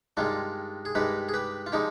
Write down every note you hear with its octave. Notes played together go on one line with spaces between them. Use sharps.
G2 D#3 G#3 D4 F4
G#4
G2 D#3 G#3 G4 B4
G#4
G4 B4
F4
D3 F3 G#3 D#4 G4